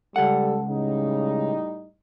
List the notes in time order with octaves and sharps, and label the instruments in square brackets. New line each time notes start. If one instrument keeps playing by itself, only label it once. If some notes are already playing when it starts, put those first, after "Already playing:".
[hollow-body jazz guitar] C#2 F#5 [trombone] G3 [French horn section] A4
[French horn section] A2 G3 D#4 [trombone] C#3